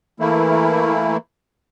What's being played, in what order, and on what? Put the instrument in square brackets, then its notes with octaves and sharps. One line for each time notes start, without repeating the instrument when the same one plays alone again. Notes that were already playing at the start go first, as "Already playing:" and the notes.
[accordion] E3 A3 A#3 E4